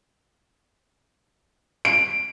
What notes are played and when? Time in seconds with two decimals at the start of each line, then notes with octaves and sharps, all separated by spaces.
1.85 D7